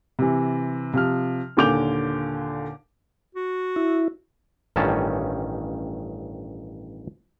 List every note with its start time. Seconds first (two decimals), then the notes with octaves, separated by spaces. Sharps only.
0.19 C3 E3
0.94 C3 F3 F6
1.57 D#2 A#2 D3 D6 G6 F7
3.35 F#4
3.76 E4
4.76 A1 G2 D#3 C#4 A5